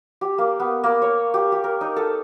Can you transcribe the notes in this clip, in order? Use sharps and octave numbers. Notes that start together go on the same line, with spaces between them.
G4
A#3
B3
A#3
C#5
G4
G4
A#4
D#4
A4